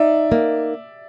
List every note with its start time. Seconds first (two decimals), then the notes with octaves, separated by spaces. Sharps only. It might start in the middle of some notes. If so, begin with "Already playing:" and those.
Already playing: D#4 D5 E5
0.32 A#3